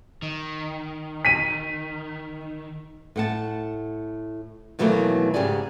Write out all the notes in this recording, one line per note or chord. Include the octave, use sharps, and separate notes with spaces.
D#3
B6 D#7
A2 F#5 A5
B2 D#3 E3 F#3 A3 A#3
G#2 C#3 G4 G#4 D5 G#5